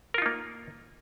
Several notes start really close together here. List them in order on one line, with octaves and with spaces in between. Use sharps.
A#4 F4 D#4 A#3